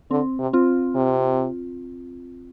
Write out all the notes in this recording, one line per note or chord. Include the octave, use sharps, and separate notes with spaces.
D3 C4
C3
C4 F4
C3